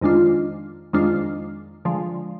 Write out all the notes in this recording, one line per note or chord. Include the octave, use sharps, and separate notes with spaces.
F2 D#3 G#3 D4 F4
F2 D#3 G#3 D4 F4
D3 F3 G#3